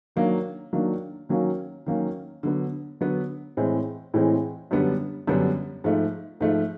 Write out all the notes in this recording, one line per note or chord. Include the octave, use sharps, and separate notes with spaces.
D#3 F#3 A#3 D4
D#3 F#3 A#3 D4
D#3 F#3 A#3 C#4 F#4
D#3 F#3 A#3 C#4 F#4
D3 F#3 B3
D3 F#3 B3
A2 E3 G#3 C4
A2 E3 G#3 C4
F#2 D3 G3 B3 D4
F#2 D3 G3 B3 D4
G#2 F3 A3
G#2 F3 A3